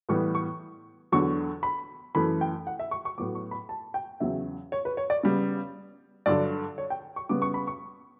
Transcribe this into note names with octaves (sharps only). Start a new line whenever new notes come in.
A2 E3 G3 B3 C#6
C#6
E2 D3 F#3 C#6
B5
F#2 E3 A3 B5
G5
F#5
E5
C#6
C#6
A2 F#3 B3 D6
C#6
B5
A5
G5
E2 C#3 F#3 E5
C#5
B4
C#5
D5
C#3 G3 B3
G2 D3 F#3 D5
C#5
G5
C#6
C#3 G3 B3 D6
C#6
B5
C#6